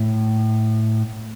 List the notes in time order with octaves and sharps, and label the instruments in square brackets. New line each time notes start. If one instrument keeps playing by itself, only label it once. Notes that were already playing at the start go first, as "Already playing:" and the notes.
Already playing: [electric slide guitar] A2